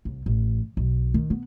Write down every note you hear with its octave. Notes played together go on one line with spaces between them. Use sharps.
C2
A1
B1
D#3
B3